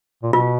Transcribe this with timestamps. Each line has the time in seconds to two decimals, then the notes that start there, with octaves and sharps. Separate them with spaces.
0.23 A#2
0.33 B2 F4